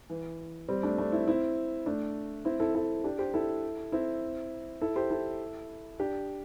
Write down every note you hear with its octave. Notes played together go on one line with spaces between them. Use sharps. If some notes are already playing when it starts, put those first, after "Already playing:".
E3
G3 C4
A3 D4
A3 D4
C4 E4
C4 E4
A3 D4
C4 E4
E4 A4
E4 A4
D4 G4
G4 C5
E4 A4
C4 E4
E4 A4
G4 C5
E4 A4
D4 G4